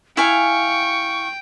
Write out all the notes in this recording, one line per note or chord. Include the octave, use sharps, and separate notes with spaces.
E4 F5 G5 G#5 C#6